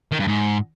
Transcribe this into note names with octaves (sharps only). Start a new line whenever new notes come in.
D#3
G2
G#2